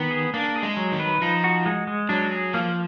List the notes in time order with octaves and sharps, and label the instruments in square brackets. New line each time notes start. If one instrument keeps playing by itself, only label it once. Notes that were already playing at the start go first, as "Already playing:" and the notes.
Already playing: [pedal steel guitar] D#3 [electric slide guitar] B3
[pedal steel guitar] G#4
[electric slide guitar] A#3 [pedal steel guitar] D4
[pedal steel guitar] G#4
[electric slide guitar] G#3
[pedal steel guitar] F#3
[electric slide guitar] D#3
[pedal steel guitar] B4
[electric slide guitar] F3 [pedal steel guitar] D#4
[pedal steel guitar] F#4
G#3
G#3
[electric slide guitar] F#3 [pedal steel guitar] D4
[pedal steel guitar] G#4
[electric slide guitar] F3 [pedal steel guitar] A#3